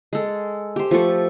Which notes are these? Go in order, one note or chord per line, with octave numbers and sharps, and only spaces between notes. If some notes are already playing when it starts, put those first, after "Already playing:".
G#3 A4
G4 C5
F3 A3 A4 C#6